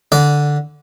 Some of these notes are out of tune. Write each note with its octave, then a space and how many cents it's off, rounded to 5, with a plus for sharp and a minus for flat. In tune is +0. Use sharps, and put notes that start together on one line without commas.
D3 +0 D5 -20